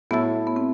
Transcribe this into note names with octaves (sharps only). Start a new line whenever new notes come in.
A2 F#3 A3 B3 E4 A4
B3
C4